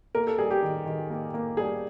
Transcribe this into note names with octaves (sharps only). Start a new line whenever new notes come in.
A#3 A#4
A4
G3 G#4
G4
D#3
D#3
A#3
A#3
G3 G#4